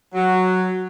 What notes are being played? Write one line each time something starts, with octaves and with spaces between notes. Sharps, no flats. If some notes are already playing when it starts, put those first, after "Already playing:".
F#3